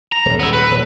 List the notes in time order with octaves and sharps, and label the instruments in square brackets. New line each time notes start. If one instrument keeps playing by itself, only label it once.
[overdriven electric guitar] A#5
[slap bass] D#1 G#2
[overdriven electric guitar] B3 E4
B4
[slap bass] D#1